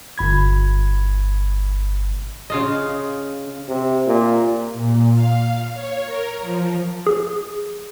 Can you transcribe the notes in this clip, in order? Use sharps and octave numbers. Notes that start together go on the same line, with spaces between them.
G1 B5 G#6
C#3 F4 D#5
C3
A#2
A#2
F5
C#5
A#4
F3
G#4